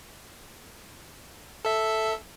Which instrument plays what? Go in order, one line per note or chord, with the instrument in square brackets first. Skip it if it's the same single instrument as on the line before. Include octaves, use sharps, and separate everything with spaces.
[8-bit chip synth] A4 E5